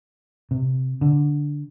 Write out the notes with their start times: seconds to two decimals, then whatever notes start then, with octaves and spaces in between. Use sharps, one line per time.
0.51 C3
1.01 D3